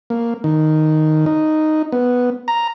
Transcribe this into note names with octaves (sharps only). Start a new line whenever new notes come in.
A#3
D#3
D#4
B3
A#5